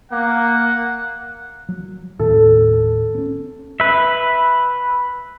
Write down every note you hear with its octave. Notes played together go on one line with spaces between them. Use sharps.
A#3 F#5
F#3
D#1 A2 D#3 A4
C4 C#4
B4 E5